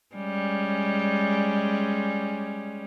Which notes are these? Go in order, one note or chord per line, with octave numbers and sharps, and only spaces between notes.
G3 G#3 C#4